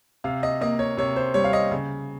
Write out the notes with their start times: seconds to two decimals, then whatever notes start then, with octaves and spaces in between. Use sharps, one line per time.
0.24 C3 F5
0.43 D#5
0.61 A#3 D#5
0.79 C#5
0.97 C3 C#5
1.16 C5
1.34 G3 C#5
1.44 F5
1.53 D#5
1.71 C#3